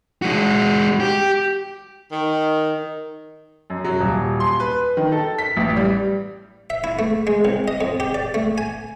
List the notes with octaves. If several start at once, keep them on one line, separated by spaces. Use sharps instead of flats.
G#3 F#4
G4
D#3
F#2
F#3
D#1
C6
B4
D#3
A4
B6
A1
G3
E5
E4
A3
G#3
C2
D#5
F2
G4
D5
A3
G#5